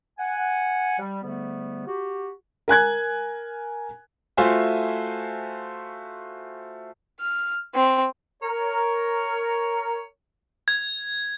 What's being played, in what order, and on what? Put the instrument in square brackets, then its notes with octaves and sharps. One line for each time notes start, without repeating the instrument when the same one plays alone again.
[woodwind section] F#5 G#5
G3
G#2 D3 G3 A3 B3
F#4 G4
[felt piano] A#4 G#5 F#6 G#6
[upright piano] A3 F4 F#4 C5 E5 G#5
[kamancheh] F6
C4
[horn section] A#4 C#5
[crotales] G#6